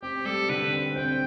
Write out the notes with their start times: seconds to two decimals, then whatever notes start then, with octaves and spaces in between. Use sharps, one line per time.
0.02 C4 G4
0.25 G3 A4
0.49 D3 B4
0.72 C4
0.96 C4 G5